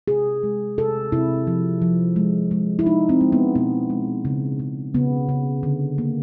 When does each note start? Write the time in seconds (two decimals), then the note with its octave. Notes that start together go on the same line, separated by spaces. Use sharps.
0.08 C3 G#4
0.43 G#3
0.78 C3 A4
1.12 C3 E4
1.47 F3
1.82 F3
2.16 G#3
2.51 G#3
2.79 E4
2.86 G#3 D#4
3.09 C4
3.21 G#3
3.32 B3
3.56 B2 B3
3.90 G#3
4.25 C#3
4.60 C#3
4.95 C#3 B3
5.29 C#3
5.63 D3
5.98 A#3